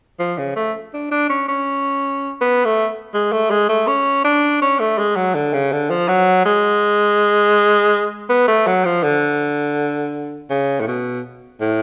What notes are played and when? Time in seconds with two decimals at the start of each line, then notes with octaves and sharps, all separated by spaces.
0.20 F3
0.38 C#3
0.56 A3
0.94 D4
1.11 D4
1.30 C#4
1.49 C#4
2.41 B3
2.65 A3
3.14 G#3
3.32 A3
3.51 G#3
3.69 A3
3.87 C#4
4.25 D4
4.62 C#4
4.80 A3
4.98 G#3
5.16 F#3
5.35 D3
5.54 C#3
5.72 D3
5.90 F3
6.09 F#3
6.46 G#3
8.30 B3
8.48 A3
8.67 F#3
8.85 F3
9.03 D3
10.50 C#3
10.81 A2
10.87 B2
11.61 A2